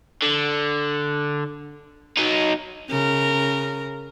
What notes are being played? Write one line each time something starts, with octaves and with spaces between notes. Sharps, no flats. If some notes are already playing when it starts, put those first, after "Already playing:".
D3
F#3 D#4
C#3 A#4